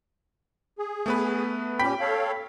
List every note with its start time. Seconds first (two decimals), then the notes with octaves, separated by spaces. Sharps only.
0.78 G#4
1.06 A3 B3 B4
1.79 A#2 C#4 G4 G5 B5 B6
2.00 A4 C#5 F5